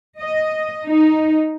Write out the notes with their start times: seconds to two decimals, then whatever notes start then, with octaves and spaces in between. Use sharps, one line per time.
0.19 D#5
0.86 D#4